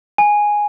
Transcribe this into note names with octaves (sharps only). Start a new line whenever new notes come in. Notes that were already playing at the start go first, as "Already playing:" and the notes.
G#5